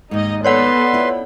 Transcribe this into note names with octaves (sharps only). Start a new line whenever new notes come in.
D#2 G#2 D#4 D#5
B3 A4 B4 C#5 D5 F#5 C6
C4 E4 F4